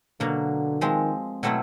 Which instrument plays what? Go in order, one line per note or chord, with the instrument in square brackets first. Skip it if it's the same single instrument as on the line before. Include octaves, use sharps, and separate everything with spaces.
[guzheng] B2 F#3 A#3 [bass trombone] D3
[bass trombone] D#3 [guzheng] F3 G#3 C4
[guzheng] B2 F#3 A3 C4 E4